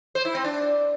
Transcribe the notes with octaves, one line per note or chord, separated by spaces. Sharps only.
C5
E4
C4
D4